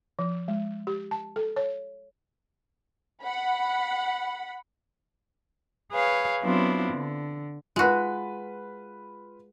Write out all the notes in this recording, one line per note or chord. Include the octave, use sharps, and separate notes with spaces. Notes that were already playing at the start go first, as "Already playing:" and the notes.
F3
G#3
G4
A5
A4
C#5
F#5 B5
G#4 B4 C#5 F5
F#3 B3 C4 D4 E4 F4
D3
G#3 F4 F#4 B4